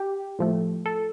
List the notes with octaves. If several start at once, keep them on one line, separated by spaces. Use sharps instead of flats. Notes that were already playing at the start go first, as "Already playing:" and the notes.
Already playing: G4
A2 F3 A3
A4